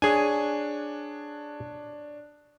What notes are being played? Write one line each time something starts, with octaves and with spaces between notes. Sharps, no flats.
D4 G#4 C#5 G#5 D#6